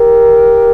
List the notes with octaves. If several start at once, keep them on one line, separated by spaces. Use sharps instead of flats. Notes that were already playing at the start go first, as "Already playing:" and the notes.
Already playing: G4 A#4